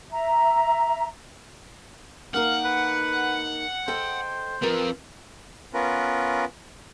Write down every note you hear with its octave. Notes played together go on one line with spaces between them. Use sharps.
E5 A#5
A#3 D#4 A#4 F5 F#5
B4
A4 C5 D#5 G5
C4 F4 A#4 B4
B3 C#4 F4 A#4 B4